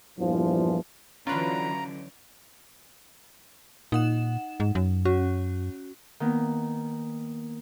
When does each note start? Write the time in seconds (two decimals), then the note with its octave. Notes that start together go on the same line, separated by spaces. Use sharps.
0.19 E2 G2 A#2 E3 F3
1.27 D3 E3 F#3 C#4 F4 B4 A#5 D7
3.92 A#2 D#4 F#5 E7
4.60 G#2
4.75 F#2
5.05 C#4 F#4
6.20 D#3 A#3 B3